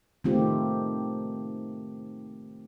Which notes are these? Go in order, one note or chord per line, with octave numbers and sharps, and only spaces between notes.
D#3 A3 C4 F4 G4